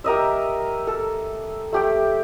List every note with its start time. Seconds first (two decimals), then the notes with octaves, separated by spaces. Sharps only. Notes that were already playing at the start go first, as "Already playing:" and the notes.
0.04 G4 A#4 D#5 E5
0.87 A4
1.72 A3 G4 G5